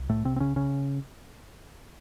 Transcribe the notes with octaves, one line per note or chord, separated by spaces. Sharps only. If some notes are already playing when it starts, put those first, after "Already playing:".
Already playing: C2
A2 A3
C3 C4
C4
C#3 C#4
C#3 C#4